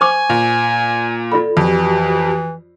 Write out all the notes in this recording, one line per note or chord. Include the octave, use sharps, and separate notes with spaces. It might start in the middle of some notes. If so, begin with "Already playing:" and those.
C5 G#5 C#6 D6
A#2
F4 A4 D5 B5
F2 E3 F#4 G4